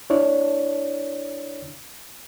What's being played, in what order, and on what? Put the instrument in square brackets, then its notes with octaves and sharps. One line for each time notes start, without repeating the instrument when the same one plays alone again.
[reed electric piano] D4 E4 C#5 D5